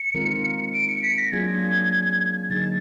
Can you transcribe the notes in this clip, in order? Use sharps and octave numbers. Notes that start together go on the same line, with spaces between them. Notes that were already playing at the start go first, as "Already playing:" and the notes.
Already playing: C#7
D#3 G#3 C4 F4 A#4
D7
C#7
B6
A#6
F#3 A#3 D4 F4 G#4 G#6
D3 F#3 A#3 D#4 G#4 A6